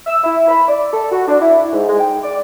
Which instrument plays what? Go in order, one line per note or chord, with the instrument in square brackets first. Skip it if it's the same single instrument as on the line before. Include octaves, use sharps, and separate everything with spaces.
[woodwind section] E6
E4
B5
D5
A4
F#4
D4
E4
G#2
G#3
G5
D5